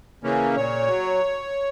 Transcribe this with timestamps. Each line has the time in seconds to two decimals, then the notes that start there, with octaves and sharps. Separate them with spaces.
0.23 C#3 E3 A#3 C#4
0.56 A#2 C#5
0.88 F#3